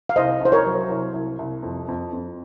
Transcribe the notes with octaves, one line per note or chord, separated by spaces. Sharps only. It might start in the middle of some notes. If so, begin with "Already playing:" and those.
F5
C2 C5 D#5
C2 C5
A#4 C#5
F#3
C2
C2
C2
F2
F2
F2